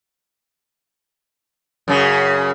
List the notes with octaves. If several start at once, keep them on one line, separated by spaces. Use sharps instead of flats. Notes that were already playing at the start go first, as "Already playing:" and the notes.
F#2 C#3